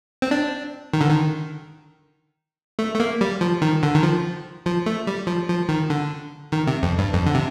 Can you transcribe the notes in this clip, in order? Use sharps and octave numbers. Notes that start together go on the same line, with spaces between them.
C4
D4
D#3
D3
D#3
A3
A3
A#3
G3
F3
D#3
D3
D#3
F3
F3
A3
G3
F3
F3
D#3
D3
D#3
C3
F2
G2
F2
D3
C3